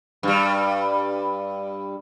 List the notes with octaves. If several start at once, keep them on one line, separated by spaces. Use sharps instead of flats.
G2 G3